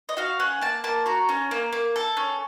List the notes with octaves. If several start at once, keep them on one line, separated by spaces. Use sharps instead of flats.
D#5
F#4 F5
C#4 F#5
A#3 A5
A#3 A5
F#4 A#5
C#4
A#3
A#3
A4
C#4